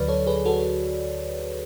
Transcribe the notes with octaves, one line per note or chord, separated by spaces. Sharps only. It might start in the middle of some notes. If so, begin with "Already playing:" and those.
Already playing: D2 D3 F#3 B4 D5
A4 C#5
G#4 B4
F#4 A4